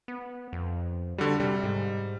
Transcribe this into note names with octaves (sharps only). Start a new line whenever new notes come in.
B3
F2
D3 G3 F#4
C3 G3
G#2